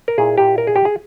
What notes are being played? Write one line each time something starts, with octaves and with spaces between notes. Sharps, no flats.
A#4
A#2 A#3 E4 G#4
G4
A#4
G#4
G4
G#4